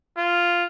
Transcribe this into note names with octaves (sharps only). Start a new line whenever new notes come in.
F4